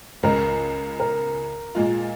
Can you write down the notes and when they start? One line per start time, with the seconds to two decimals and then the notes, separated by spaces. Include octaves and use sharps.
0.23 C#2 C#3 G#3 A#4
1.00 A#4
1.75 A#2 G#3 F4